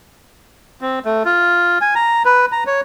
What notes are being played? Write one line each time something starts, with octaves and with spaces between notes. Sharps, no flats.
C4
A3
F4
G#5
A#5
B4
A#5
C#5